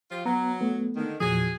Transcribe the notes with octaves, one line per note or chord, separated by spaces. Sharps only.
F3 F4 G4
F#3 B3 A#5
A3 B3
D3 D#3
E2 A#2 F3 F#3 G#4